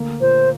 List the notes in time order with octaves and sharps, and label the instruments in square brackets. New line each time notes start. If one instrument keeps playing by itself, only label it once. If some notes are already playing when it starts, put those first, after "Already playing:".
Already playing: [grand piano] D2 A#3
[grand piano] A#2 [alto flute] C5